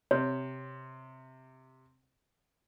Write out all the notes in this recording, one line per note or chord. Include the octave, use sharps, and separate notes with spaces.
C3 C#5